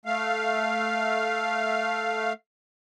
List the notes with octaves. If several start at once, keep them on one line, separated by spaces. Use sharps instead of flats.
A3 F5